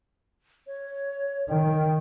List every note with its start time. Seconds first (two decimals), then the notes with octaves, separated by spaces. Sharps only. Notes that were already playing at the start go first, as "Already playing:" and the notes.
0.67 C#5
1.49 D#3 G5